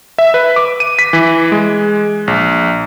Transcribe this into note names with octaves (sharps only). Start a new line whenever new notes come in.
E5
B4
D6
D#7
B6
E3
G#3
A#1